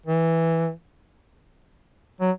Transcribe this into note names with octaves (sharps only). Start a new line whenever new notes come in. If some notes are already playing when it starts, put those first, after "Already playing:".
E3
F#3